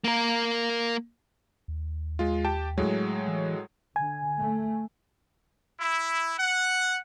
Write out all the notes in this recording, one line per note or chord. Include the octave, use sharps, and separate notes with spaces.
A#3 A#4
D#2
G#3 F4
G4 G5 A5
A2 F#3 G#3
E3
D3 G#5
A3
E4
F#5